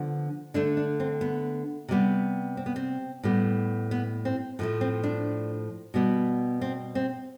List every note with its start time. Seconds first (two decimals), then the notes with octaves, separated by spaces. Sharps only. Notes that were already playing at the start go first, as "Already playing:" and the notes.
Already playing: D3 F3 B3
0.54 D3 A3 D4
0.77 D4
1.00 C4
1.21 B3
1.88 C3 G3 B3
2.57 C4
2.66 B3
2.76 C4
3.23 A2 G3 B3
3.91 B3
4.25 C4
4.59 A2 F3 A3 B3
4.81 C4
5.03 D4
5.94 B2 G3 B3
6.61 C4
6.95 C4